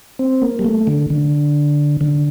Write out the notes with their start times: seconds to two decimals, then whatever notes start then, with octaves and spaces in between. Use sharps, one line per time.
0.19 C4
0.42 A#3
0.59 G3
0.65 A3
0.87 D3
1.10 D3
2.01 D3